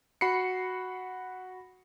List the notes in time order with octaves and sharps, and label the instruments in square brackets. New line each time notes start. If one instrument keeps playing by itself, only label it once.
[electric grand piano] F#4 B5 C7 C#7